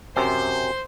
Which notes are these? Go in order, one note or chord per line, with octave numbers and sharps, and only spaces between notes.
F#2 C3 C5